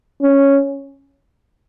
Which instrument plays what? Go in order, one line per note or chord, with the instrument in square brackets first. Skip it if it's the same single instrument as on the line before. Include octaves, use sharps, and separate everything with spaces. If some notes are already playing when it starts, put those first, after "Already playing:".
[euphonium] C#4